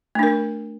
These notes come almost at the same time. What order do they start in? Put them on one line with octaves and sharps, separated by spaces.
A3 D4 A#4